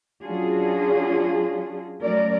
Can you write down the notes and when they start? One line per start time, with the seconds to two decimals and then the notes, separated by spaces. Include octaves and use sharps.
0.23 F#3 C#4 D4 F4 F#4 G#4
2.00 F#3 A3 C#4 A#4 D5